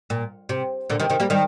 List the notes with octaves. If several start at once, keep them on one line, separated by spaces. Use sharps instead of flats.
A#2
C3
A#2 D3
C3 D#3
C3 D#3
G3 A#3
D#3 G3